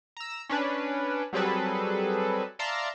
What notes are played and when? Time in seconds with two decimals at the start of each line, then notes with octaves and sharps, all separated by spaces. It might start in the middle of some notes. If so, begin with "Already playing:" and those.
0.17 A#5 E6
0.49 C#4 D4 B4
1.33 F#3 G3 C4 G#4 A4 B4
2.59 D5 E5 F5 A5 A#5 C6